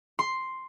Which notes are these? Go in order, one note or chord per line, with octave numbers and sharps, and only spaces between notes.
C6